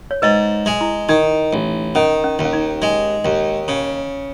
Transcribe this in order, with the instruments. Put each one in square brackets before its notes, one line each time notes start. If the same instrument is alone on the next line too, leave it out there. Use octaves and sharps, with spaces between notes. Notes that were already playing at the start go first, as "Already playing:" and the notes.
[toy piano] C#5
[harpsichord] G#2 [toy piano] B4 D#5
[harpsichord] G#3
[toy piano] E4
[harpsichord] D#3 [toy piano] D#4
[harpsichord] A1
[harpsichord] D#3 [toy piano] C#4
[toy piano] C#4
[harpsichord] D#2
[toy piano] C#4
D#4
[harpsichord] G#3
D#2
C#3